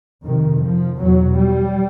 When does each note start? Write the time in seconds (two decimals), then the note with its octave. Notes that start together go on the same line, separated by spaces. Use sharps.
0.25 F2 C3 D#3
0.63 F3
1.00 E2 B2 F#3
1.38 G3